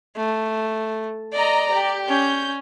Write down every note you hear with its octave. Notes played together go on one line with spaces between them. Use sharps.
A3
D5 D#5 A#5
G4
C#4 G6